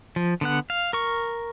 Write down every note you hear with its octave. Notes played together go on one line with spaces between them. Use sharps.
F3
D3 B3 F#5
F5
A#4 C#6